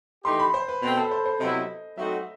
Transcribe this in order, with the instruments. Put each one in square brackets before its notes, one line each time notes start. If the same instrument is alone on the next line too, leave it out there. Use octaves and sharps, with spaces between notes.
[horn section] E3 A3 D#4 G4 [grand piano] C6
[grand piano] B5
C5
B4
[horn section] B2 A3 C4 [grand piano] B4
[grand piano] A4
C5
C5
[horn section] C3 F#3 B3 E4 [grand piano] D#5
[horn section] F#3 A3 C4 D#4 F#4 [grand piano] E5